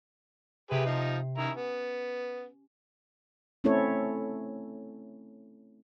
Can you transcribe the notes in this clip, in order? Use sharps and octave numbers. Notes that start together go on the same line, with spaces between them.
C3 G4 G#4 B4
F3 D#4 C7
D#3 C#4 E4 A#5
B3
A3 C4 C#4 E4 A4 C#5